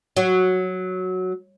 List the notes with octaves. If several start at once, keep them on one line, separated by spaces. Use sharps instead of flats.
F#3